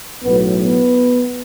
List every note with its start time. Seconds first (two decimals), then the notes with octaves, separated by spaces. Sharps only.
0.23 B1 A2 F#3 B3
0.64 B3